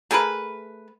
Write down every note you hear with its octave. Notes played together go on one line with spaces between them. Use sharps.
A3 G#4 A#4 B4